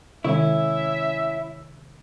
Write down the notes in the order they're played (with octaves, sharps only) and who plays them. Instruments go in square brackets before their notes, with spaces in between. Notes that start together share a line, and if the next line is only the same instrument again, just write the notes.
[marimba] C3 D#3 G#3 [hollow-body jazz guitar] C#4 E4 [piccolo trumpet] E5